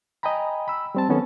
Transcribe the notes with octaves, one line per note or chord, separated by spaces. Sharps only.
D#5 G5 G#5 A#5 B5
B5 E6
G3 C4 A5
D#3 F#3 B3 C#4 A4